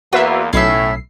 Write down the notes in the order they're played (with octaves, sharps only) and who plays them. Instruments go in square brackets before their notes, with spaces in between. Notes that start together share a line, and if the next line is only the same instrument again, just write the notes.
[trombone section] E2 A#3 [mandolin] F4 [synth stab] F#4 B4 E5
[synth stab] B1 C7 [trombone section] A2 [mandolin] C#4 E4 E5